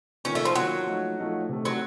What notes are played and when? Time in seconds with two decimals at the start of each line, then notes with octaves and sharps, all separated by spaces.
0.25 D#3 A#3 C#4 F4
0.35 A3
0.45 F3
0.55 D#3 F#3 A#3 F4
0.87 F3 A3 D#4
1.18 F3 A3 D#4
1.49 C3 D#3 A3
1.65 F#3